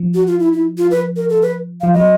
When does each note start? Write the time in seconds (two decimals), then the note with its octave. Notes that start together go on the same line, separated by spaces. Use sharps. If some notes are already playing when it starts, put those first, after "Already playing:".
Already playing: F3
0.14 F#4
0.27 F4
0.40 E4
0.53 E4
0.78 F4
0.91 B4
1.16 A#4
1.29 A4
1.42 B4
1.81 F3 F5
1.94 F#3 D#5